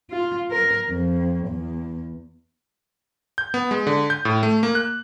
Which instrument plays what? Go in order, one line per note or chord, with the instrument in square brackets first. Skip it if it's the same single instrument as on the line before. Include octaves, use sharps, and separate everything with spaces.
[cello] F4
A#4
F2
E2
[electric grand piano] G6
B3
G#3
D3
G6
A2
A3
A#3
F#6